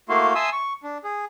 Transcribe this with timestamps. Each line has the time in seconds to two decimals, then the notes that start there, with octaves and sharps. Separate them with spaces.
0.09 A3 A#3 E4 F#4 F5 C6
0.35 E5 G#5 A5 C6 D#6 E6
0.53 C#6
0.83 D4
1.04 G#4